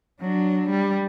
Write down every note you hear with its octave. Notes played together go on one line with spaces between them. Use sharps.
F#3 D4
G3